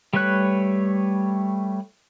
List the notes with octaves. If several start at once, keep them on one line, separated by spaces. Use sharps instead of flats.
G3 A3 B4 C#5 F#6